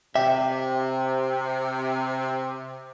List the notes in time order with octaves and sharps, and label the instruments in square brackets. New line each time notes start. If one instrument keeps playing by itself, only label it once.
[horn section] C3 [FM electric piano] G4 [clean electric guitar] E5